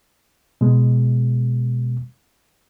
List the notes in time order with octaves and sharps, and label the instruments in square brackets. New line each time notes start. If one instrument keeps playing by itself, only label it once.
[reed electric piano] B2 G#3